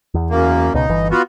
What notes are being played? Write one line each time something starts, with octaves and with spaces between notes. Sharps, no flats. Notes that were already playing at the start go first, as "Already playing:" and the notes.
E2
F#2 A#3
C#2 B2 D#4
G1 E3
B3 F4 F#4